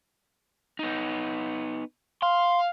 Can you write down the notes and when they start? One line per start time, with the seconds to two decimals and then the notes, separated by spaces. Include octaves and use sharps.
0.79 B3 D#4
2.23 F5 C6